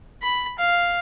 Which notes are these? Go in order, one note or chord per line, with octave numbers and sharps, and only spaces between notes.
B5
F5